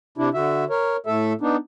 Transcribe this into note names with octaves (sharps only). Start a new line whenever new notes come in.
C3 D4 E4
D3 F#4 E5
A#4 C#5
A2 A3 A4 E5
B3 D4 D#4